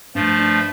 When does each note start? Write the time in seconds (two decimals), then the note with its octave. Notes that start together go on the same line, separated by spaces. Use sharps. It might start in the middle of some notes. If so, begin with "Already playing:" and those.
0.15 G2 F3 A3
0.39 D4